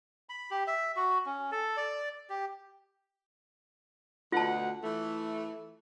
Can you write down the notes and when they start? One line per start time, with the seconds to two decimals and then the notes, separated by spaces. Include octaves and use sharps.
0.29 B5
0.51 G4
0.67 E5
0.96 F#4
1.26 C#4
1.52 A4
1.77 D5
2.29 G4
4.32 D2 B2 F4 F#5 A5
4.83 E3 A3